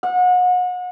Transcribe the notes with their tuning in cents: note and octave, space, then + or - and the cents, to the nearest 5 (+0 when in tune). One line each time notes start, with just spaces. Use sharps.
F#5 -35